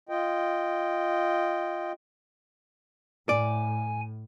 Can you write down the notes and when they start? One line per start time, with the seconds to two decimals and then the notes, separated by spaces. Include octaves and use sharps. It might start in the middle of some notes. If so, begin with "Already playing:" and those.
0.09 F4 D#5 G5
3.29 A2 D5 G#5